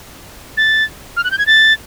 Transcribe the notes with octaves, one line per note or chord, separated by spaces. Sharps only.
A6
F6
F#6
G6
G#6
A6